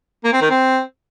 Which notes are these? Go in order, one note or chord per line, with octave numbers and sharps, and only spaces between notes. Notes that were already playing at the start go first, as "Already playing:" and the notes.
A#3
C4
D#3
C4